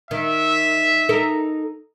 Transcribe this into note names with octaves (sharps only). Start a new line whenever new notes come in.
D#3 E5
D#4 A4 A#4